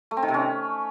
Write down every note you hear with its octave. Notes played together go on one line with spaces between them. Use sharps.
A3
C4
D#3
C3
C#4